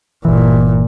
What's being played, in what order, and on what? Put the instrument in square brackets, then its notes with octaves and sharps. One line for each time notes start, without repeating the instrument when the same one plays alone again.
[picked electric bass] G1 E3 [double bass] A#2